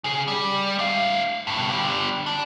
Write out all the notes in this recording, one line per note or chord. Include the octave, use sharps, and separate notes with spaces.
C#3 G#4
G3
A3 F5
G2 B2
D3 G3
D4